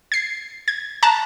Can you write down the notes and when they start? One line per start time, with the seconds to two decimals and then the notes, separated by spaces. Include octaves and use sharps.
0.12 G#6 C7
0.68 G#6
1.03 A5 A#5 F#6